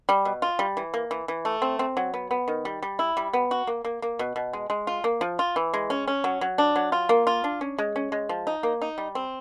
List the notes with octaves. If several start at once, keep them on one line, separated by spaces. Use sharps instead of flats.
G3
B2
F4
G3
E3
A#3
E3
E3
A3
C4
C4
F#3
B3
B3
D#3
G3
G3
E4
G3
B3
F#4
A#3
A#3
A#3
B2
B2
G#3
G#3
F4
A#3
F3
F4
E3
G#3
C#4
C#4
F#3
F#3
D4
F#3
F4
A#3
F4
D4
C#4
G#3
C#4
G#3
F3
D#4
A#3
D#4
G3
C4